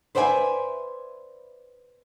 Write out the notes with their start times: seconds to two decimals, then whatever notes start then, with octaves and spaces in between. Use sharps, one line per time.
0.15 B4 C5 D5 E5 F#5 G#5